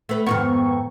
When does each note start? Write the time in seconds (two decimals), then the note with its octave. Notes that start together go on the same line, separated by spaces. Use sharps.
0.09 A3 B4
0.26 F2 G#2 D#3 B3 C#6